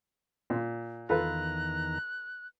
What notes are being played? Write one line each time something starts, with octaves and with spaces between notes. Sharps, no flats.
A#2
E2 D#3 F4 A4 B4 A#5 F#6